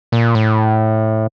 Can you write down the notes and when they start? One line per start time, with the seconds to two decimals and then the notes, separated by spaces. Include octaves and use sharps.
0.12 A#2
0.35 A2